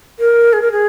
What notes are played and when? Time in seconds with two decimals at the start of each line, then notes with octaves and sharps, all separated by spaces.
0.19 A#4
0.53 G#4
0.62 A#4
0.72 G#4